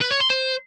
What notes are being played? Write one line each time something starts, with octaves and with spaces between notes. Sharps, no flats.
B4
C#5
C6
C5